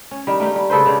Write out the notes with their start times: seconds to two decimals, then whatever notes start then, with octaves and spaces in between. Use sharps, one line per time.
0.11 C#4
0.27 D#3 G3
0.40 A3 A#3 D4 G4
0.56 G3
0.70 C#3 A4 B4 C5
0.86 C#3 G#3 D4 G4